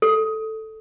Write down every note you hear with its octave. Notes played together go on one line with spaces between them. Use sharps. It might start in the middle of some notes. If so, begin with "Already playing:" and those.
A4